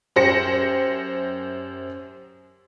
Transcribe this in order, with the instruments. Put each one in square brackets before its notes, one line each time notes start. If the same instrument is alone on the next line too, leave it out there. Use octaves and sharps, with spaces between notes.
[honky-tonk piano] F#2 G4 C5 A#6 C#7